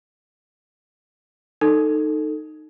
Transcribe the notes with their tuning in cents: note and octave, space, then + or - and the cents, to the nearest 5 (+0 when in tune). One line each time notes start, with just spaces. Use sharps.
D#4 -10 A4 +10